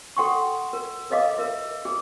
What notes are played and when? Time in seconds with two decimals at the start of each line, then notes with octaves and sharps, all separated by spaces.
0.17 A4 F#5 G5 C6 C#6
0.73 A#4
1.10 A4 B4 D#5 F5 D6
1.38 A#4 E5
1.85 G#4 A4